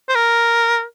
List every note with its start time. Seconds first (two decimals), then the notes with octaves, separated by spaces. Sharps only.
0.09 C5
0.15 A#4